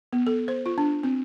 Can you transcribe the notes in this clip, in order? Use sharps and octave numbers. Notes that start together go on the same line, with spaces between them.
B3
A4
C5
F4
D4
C4